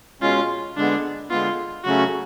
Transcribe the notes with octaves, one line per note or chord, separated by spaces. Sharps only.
B2 G#3 C#4 F4
D3 G#3 B3 D4
D3 G#3 B3 F4
C#3 F#3 A3 C#4 F#4